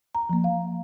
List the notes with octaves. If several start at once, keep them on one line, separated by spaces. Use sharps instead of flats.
A#5
F3 A#3
F5